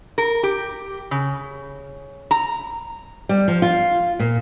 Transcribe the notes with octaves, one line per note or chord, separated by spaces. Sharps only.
A#4
G4
C#3
A#5
G3
F3
F4
A#2